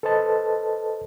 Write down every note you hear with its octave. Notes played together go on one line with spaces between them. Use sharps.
A4 B4 C5 D#5 A5